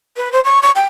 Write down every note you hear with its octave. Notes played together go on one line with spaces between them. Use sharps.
B4
C5
C#6
C#6
G5